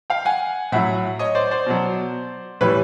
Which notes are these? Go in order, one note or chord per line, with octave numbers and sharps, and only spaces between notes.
F5 G5
F#5 G#5
A2 F#3 E5 F#5
C#5 D#5
C5 D5
C5 D5
B2 F#3
A2 E3 G3 B4 C#5